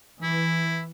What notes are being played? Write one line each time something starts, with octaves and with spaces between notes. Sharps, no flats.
E3 E4